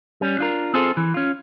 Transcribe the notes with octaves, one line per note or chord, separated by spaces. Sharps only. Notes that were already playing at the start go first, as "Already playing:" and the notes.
G3 C#4
D4 F4 A#4
C4 F4 G#4 A4 C5
E3
C#4 F4